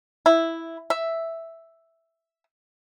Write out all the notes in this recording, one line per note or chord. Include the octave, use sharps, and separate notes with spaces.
E4
E5